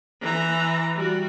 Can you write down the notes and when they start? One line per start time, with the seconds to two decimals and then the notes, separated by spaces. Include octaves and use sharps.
0.22 E3 A#5
0.96 G3 F#4